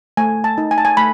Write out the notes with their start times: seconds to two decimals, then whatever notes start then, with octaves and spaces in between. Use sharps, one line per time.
0.17 A3 G#5
0.44 A5
0.58 D#4
0.71 G#5
0.78 A5
0.85 G#5
0.97 A3 B5